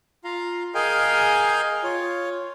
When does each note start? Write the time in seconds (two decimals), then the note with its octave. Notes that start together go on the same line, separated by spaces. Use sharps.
0.24 F4 F5 A#5
0.75 G#4 A#4 D#5 F5 G5 G#5
1.84 F4 C#5